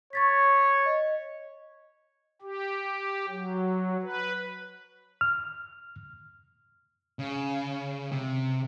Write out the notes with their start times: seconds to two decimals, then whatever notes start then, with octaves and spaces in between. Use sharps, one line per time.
0.13 C#5 C#6 A6 B6
0.86 D#5
2.42 G4
3.28 F#3
4.02 B4
5.21 F6
7.19 C#3
8.12 C3